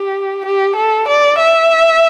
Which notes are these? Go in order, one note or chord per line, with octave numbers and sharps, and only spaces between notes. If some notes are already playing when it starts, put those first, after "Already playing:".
Already playing: G4
G4
A4
D5
E5